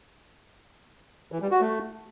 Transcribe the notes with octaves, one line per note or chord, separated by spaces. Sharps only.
E3
G3
F#4
A3